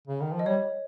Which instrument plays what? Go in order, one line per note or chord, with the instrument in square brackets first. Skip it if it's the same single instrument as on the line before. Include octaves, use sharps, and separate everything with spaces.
[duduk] C#3
D#3
F3
[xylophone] D#5
[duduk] G3 [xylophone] C#5